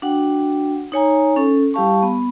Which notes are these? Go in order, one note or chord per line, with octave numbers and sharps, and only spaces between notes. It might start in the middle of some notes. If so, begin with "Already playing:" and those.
D4 F#4 F#5 G5
D#4 C#5 G#5 A#5
C#4 A4 C#6
G3 E4 G4 F5 A5 C#6
B3